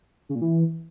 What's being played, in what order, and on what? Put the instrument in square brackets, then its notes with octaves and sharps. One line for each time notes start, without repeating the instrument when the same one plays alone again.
[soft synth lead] C#3
A#2
E3